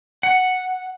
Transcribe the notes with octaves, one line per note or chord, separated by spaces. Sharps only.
F#5